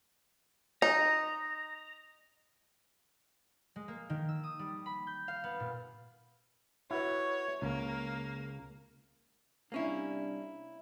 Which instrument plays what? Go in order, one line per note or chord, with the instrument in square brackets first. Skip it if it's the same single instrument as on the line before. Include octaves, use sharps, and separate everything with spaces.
[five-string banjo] D#4 [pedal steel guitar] A#5
[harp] G#3
A#3
D#3
E6
D#6
G3
B5
G6
F5
B3
A#2
[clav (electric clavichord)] E4 F#4 B4 [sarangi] C#5
[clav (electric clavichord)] C#2 [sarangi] A#3
[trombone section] C3 G3 D4 [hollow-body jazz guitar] A#3 C#4 E4